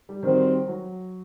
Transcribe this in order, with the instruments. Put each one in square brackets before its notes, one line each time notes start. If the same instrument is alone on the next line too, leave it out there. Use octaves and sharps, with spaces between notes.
[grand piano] G3
[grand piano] D#3 [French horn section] G3 C4 F#4 C5
[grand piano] F#3